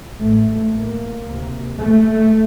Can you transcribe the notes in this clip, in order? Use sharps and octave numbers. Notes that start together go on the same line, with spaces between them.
A1 A2 A3
A#3
D2 C3
A3